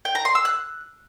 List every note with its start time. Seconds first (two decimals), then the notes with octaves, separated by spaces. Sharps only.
0.05 G5
0.15 A#5
0.25 C6
0.35 E6
0.45 F#6